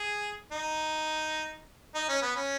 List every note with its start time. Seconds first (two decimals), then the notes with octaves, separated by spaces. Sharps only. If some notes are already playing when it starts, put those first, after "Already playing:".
Already playing: G#4
0.52 D#4
1.95 D#4
2.08 C#4
2.22 B3
2.36 C#4